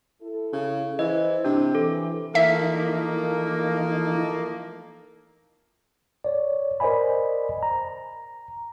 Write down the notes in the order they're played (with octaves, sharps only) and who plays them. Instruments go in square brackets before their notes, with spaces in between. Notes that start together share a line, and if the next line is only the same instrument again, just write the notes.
[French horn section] E4 A4
[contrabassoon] C#3
[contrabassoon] E3 [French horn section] C5 [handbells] D#5
[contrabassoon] C3 [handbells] D4
[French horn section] E3 [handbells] A4
[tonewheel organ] E3 D#4 [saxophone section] F3 A3 A#3 [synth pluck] E5
[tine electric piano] C#5 D5
A#4 C5 D5 D#5 G#5 B5
A#5